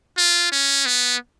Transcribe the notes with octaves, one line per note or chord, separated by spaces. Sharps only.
F4
C#4
B3